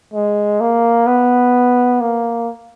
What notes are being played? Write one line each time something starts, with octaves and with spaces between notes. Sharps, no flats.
G#3
A#3
B3
A#3